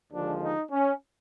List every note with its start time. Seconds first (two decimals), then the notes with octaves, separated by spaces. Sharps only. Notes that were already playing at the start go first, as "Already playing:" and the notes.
0.13 D#2 D3 F3 G#3 D4
0.42 D#4
0.71 C#4